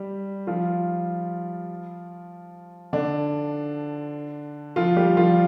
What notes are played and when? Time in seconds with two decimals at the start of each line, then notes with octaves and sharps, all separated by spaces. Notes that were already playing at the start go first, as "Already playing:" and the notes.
Already playing: G3 G4
0.47 F3 F4
2.93 D3 D4
4.76 F3 F4
4.96 G3 G4
5.17 F3 F4